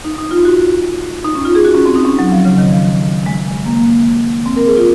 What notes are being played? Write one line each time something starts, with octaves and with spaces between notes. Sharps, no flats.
D#4
D#4
F4
F#4
D#4
C#4
F4
G#4
F#4
C#4
C4
D#4
C#4
F#3
F3
C#3
D#3
F3
G#3
A#3
C4
A#4
G#4
F4